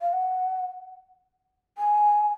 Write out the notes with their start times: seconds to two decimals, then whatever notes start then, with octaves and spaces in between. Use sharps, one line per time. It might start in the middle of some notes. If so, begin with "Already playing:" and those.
0.02 F5
0.13 F#5
1.78 G#5